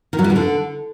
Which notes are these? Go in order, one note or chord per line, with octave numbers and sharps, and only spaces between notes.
D#3
F#3
G3
E3
D3